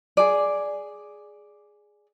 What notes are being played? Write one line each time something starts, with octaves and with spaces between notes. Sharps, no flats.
G#4 D5